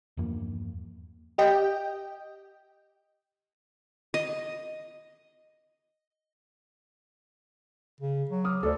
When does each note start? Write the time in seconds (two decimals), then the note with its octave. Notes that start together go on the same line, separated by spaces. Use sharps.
0.17 E2 G2 F3 A#3
1.38 G4 D#5 G5
4.14 D#5
8.01 C#3
8.29 F#3
8.44 D6 D#6 F6
8.63 D2 A4 C5 D5